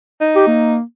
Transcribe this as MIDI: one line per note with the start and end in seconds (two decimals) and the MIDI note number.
0.21 0.76 63
0.36 0.47 67
0.48 0.82 58